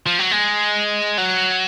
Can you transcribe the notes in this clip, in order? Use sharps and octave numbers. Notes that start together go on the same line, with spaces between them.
F3
F#3
G#3
F#3